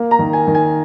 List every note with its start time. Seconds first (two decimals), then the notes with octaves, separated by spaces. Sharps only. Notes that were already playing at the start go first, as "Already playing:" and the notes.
Already playing: A#3
0.11 A#5
0.19 D#3
0.33 G#5
0.47 D#3
0.55 G#5